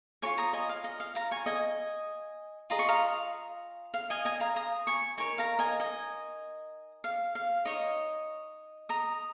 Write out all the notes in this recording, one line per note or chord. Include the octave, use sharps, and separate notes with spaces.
F4 A#4 C#5 G#5 C#6
A#5 D#6
D#5 G#5
F5
D#5
F5
F5 A#5
G#5 C#6
D#5 G#5
F4 G#4 D#5 A#5
C#6
F5 A#5
F5
D#5 G#5
D#5 G#5
F5 A#5
A#5 D#6
G#5 C#6
D#4 A#4 C#5 G#5 C#6
F5 A#5
D#5 G#5
D#5 G#5
F5
F5
D#4 C#5 D#5
A#5 D#6